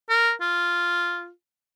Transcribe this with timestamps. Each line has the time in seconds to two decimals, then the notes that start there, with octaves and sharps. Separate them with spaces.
0.09 A#4
0.41 F4